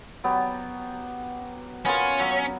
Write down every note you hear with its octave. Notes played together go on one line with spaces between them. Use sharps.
F#3 B3 G4
B3 C#4 F4 A#4
F#3